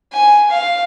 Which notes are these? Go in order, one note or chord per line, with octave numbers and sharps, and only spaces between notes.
G#5
F5